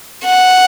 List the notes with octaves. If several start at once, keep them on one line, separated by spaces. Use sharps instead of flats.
F#5